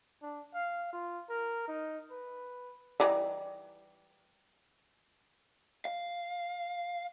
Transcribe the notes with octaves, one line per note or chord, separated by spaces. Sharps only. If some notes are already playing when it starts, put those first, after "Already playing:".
D4
F5
F4
A#4
D#4
B4
E3 G3 D#4
F5